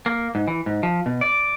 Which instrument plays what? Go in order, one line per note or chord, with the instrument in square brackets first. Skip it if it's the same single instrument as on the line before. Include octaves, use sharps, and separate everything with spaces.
[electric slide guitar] A#3
G#2
E3
G#2
F3
B2
D5